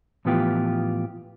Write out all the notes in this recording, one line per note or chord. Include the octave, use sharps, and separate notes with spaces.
A2 E3 F3 B3 F4 G4